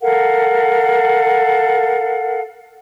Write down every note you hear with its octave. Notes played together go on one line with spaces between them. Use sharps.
A4 A#4 F5 F#5